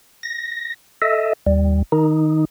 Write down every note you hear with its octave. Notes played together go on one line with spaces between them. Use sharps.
A#6
A4 D#5 E5
D#2 G3
D#3 D#4